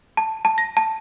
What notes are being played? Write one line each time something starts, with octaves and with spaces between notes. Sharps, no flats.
A5
A5
A#6
A5